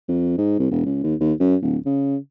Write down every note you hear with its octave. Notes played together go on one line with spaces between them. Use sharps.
F2
G#2
C2
E1
C#2
D#2
D#2
F#2
D1
C#3